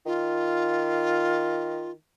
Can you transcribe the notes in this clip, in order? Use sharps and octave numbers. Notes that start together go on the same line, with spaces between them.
D#3 F4